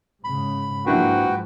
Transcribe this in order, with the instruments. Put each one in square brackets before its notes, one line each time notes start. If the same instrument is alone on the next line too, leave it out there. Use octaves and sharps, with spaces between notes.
[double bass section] G#2 C#3 [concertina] B5
[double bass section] G#2 F3 [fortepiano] A#3 D4 E4 [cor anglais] F#4 [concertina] B4 G5